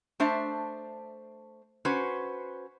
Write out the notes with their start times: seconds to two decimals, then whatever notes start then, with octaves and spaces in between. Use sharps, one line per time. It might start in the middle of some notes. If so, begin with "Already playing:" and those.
0.20 A3 D4 C5 E5 A5
1.85 C#4 F#4 B4 C5